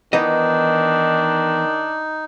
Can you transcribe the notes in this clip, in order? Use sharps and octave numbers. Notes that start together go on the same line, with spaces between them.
D#3 E3 B3 D4 D#4 D#5